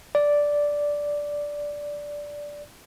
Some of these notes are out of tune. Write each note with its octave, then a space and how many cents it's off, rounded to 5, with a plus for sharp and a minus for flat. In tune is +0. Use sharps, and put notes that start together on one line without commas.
D5 -5